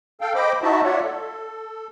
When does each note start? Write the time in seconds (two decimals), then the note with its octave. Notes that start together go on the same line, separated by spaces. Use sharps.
0.21 A4 F5 G5
0.35 C5 D#5 G5 B5 D6
0.62 D#4 E4 F#4 D#5 E5 A5
0.84 F4 C#5 D5 E5 F#5
1.04 A4